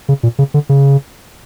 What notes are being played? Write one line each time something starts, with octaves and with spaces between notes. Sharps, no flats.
C#3
A#2
C#3
D3
C#3